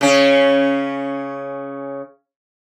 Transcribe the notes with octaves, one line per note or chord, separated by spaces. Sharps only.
C#3 C#4